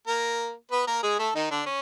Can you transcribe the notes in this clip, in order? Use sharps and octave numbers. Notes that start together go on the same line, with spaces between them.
A#3 A#4
B3 B4
A#3 A#4
G#3 G#4
A3 A4
D#3 D#4
D3 D4
C#4